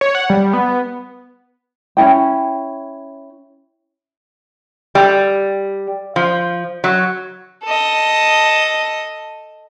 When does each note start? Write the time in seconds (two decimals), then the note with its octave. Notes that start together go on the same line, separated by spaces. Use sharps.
0.01 C#5
0.15 F#5
0.30 G3
0.53 B3
1.97 C#4 D#4 E4 G5
4.95 G3
6.16 F3
6.84 F#3
7.64 A4 D#5